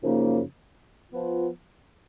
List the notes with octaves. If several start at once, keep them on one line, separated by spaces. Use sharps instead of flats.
F#2 C#3 F3 A#3 D#4
F3 B3 F4